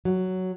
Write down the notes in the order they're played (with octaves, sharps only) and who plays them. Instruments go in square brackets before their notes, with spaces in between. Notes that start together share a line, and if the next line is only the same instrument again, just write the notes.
[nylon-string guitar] F#3